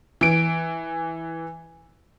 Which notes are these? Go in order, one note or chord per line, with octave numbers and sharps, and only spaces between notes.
E3 D7